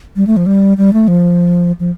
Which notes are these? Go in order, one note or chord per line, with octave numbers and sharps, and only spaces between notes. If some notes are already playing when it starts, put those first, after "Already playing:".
G3
A3
F3
G3
G3
A3
F3
F3